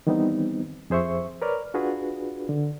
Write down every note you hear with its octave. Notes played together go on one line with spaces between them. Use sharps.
D#3 E3 G3 B3 C4 D#4
F2 G#4 C5 E5 C#6
A#4 B4 C#5 D5 F6
D4 F4 F#4 G#4 B4
D3